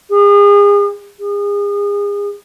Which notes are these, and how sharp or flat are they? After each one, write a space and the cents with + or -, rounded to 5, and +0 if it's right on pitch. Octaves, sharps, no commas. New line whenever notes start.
G#4 -35
G#4 -35